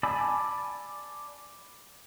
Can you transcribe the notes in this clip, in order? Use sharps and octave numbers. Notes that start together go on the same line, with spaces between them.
D5 G#5 A5 B5 E6